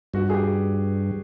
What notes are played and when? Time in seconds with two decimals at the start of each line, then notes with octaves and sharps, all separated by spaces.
0.14 G2 F#4
0.30 G#4
0.34 G4